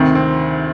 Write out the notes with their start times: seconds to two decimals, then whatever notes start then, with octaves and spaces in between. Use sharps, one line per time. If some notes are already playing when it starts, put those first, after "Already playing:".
Already playing: D2 C3 D#3 C4
0.15 C4